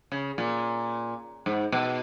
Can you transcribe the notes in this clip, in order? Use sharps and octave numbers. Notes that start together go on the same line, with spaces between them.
C#3
A#2
G#2
B2